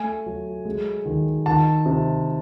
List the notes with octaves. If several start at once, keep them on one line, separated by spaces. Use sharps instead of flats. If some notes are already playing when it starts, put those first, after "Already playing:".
Already playing: A3 G#5
F#3
G#3
D#3
D#3 A5
C3